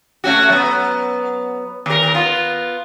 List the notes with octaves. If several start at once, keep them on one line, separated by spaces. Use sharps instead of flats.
A3 C#4 F#4
F#3 B3
D#2 A#4
B3 F4